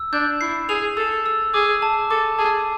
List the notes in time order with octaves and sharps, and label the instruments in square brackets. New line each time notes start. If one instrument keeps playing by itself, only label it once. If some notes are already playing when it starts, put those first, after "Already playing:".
Already playing: [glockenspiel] E6
[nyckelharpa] D4 [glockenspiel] G6
[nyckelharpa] E4 [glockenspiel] C7
[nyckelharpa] G#4 [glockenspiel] F7
[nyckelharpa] A4 [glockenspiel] E6
[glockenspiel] E6
[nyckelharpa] G#4 [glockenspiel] D6
[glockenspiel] A5
[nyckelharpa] A4 [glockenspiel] D6
[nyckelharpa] G#4 [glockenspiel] A5